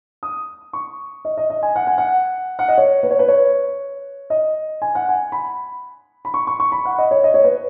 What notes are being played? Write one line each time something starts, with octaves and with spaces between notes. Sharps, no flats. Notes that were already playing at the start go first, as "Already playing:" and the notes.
D#6
C#6
D#5
D#5
D#5
G#5
F#5
G#5
F#5
F#5
D#5
C#5
B4
C#5
B4
C#5
D#5
G#5
F#5
G#5
B5
B5
C#6
C#6
C#6
B5
F#5
D#5
C#5
D#5
C#5
B4